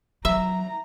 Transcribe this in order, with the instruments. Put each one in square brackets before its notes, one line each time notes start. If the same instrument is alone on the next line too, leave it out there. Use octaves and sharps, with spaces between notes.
[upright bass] F#3 [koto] E5 [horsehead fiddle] A#5